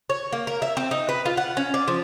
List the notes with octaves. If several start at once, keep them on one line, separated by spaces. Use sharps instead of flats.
C#5
A#3
A#4
E5
C4
D#4
B4
F4
F#5
C#4
D5
F3